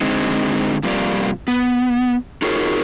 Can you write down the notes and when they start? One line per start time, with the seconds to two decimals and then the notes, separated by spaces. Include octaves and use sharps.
0.01 D3 G#3 C4 D#4
0.83 F2 C3 G3 A#3 F4 D5
1.48 B3
2.42 D#4 F4 F#4 G#4 A#4 C#5